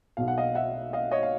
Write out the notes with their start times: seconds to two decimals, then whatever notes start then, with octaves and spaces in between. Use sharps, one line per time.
0.17 B1 B2 F5
0.28 F#5
0.38 D#5 F5
0.55 E5 F#5
0.93 D#5 F5
1.11 C#5 D#5
1.23 F5